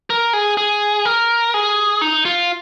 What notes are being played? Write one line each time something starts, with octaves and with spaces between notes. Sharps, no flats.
A#4
G#4
G#4
A#4
G#4
D#4
F4